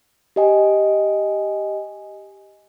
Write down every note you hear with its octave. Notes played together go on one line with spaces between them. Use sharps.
G4 D#5 G#5